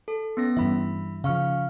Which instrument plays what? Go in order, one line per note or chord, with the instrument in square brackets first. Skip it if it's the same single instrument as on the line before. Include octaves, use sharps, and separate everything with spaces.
[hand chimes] A4
B3 C#4 A#6
[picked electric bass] G2 E3 [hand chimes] E5 B5
[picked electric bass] C#3 F3 [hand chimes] F5 C#6 F6